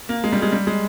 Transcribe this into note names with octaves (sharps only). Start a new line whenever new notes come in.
A#3
G#3
G3
G#3
G3
G#3